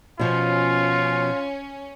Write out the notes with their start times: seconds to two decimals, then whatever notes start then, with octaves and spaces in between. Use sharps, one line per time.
0.19 B2 F3 C#4 F4